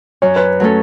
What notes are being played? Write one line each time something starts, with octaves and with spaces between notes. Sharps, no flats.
F#2 C#5
B4
F#3 A3 C#4 A4 B4